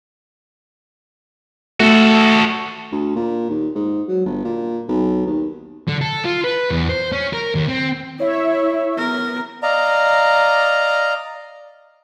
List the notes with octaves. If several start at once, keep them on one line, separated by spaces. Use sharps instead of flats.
A3 F#4 A4
D2
A#2
D#2
G#2
F#3
G1
A#2
B1
D#2
D3
A4
F4
B4
E2
C5
C#4
A#4
D#2
C4
E4 C#5 E5
B3 A#4
D5 D#5 F5 A#5